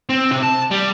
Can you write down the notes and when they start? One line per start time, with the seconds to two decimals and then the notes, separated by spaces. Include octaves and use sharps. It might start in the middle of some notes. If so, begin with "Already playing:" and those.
0.09 C4
0.31 C3
0.43 A5
0.71 G3